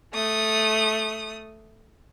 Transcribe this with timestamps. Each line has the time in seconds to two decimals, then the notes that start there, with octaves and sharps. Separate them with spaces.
0.13 A3 D#6